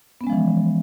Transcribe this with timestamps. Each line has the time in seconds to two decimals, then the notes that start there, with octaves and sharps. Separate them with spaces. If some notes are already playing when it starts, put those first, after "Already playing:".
0.21 B3
0.24 C#4
0.27 G#3
0.30 F3
0.33 E3